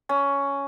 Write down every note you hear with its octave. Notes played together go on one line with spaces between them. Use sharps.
C#4